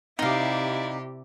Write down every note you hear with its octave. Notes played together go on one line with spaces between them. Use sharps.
C3 D#4 E4 G4 D5 F5